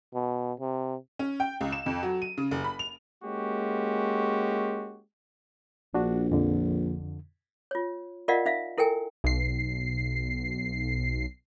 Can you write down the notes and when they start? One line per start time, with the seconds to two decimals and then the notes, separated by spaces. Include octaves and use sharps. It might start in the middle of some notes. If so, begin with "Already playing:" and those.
0.14 B2
0.60 C3
1.19 C#4
1.40 G5
1.61 C#2
1.72 E7
1.86 F2
2.03 F#3
2.22 D#7
2.38 C#3
2.51 F#1
2.64 B5
2.79 F7
3.24 G#3 A#3 C#4 F#4 G4
5.94 A#1 D4 F#4
6.32 F2 D3
7.71 F4 C#5
8.28 F4 A#4 D5 D#5 F5 F#5
8.46 D#4 E5 F5
8.78 E4 A4 A#4 G5 G#5
9.24 B1 C7